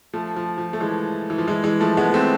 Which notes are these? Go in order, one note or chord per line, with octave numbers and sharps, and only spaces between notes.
F3 A3
F3
F3
A3
E3 G#3
E3
F3
E3 G#3
E3 G#3
F3 A3
G#3 B3
A3 C4